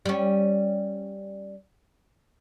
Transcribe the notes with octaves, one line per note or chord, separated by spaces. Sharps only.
G3 C#4